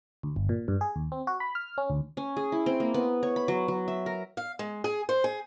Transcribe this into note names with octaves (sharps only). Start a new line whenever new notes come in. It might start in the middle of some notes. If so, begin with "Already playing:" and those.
D2
G1
A#2
G2
G#4
D#2
C4
F#4
B5
F6
C#4
D2
C#4
G#4
E4
C4
A#3
B3
C#5
B5
F#3
F#3
E5
A#4
F5
G#3
G#4
C5
G#4